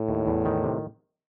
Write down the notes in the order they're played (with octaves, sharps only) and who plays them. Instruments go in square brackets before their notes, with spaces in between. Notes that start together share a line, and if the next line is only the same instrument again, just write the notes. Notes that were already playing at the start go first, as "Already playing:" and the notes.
Already playing: [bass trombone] A2
[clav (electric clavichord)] D#2
E2
D#3
C3